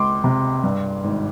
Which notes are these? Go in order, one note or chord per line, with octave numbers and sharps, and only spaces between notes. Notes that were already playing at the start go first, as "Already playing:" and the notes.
Already playing: C#2 C6 D6
C3
G2
G#1